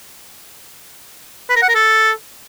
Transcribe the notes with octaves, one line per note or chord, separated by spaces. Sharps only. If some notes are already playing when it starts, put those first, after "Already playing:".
B4
A#4
F#5
A#4
A4